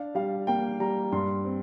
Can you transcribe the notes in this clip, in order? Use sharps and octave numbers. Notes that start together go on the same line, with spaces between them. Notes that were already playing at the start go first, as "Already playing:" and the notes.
Already playing: D4 F5
G3 F5
A#3 G5
G3 A#5
G2 C6
C4